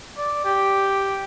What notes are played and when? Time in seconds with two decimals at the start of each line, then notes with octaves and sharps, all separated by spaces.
0.17 D5
0.45 G4